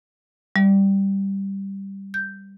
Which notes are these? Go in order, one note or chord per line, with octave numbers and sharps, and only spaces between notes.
G3
G6